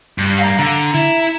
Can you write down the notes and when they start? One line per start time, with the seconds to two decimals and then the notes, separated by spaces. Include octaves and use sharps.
0.18 G2
0.39 F5 A#5
0.59 D3 A#5
0.94 E4